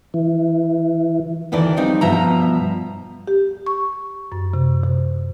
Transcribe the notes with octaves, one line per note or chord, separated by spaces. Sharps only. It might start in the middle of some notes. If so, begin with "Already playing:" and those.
E3
D2 D#3 E3 A4 D5
F3 G3 C4 D#4
G2 B2 F3 E5 A#5
G4
C#6
F#2
C3
C3